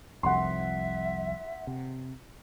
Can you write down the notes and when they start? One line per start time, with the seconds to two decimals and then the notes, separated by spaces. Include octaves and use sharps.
0.23 F1 C2 F2 E5 F#5 C6
1.67 C3